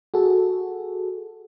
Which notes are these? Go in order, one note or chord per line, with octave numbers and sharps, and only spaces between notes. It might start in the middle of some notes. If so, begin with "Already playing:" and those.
F#4 G#4 A4